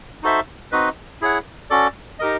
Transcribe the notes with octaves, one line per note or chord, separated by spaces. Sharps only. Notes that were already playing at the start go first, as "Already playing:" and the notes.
D#4 F#4 A4 C5 E5
C4 D#4 F#4 B4 D#5
E4 G#4 C#5 F#5
C#4 F#4 A4 D5
D#4 G4 A#4 D#5